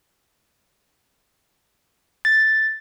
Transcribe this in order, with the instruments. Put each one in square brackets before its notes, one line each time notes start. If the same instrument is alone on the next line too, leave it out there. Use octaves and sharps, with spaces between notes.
[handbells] A6